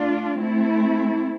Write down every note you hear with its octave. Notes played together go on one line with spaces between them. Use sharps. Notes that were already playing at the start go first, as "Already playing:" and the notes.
Already playing: A3 D4 F4
A3 C4 E4